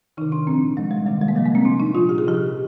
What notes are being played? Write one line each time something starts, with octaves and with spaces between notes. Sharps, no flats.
C3 D#3 D#4
D4
A#2 F3 C4
A#2 F3 G#3
G3
C3 D#3 G#3
G3
A#3
C3 F3 G#3
A#3
C4
C3 F3 D4
D#4
A#2 F3 F4
G4
G#4
C3 F3 G4